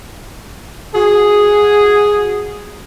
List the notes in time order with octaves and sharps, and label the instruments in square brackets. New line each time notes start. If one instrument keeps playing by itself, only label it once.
[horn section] F#4 G#4